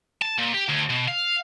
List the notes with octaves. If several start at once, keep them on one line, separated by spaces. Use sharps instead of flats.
A5
A#2
G4
D2
B2
F5